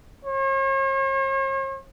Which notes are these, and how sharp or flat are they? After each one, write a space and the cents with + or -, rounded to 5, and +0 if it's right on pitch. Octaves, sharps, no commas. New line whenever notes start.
C#5 -45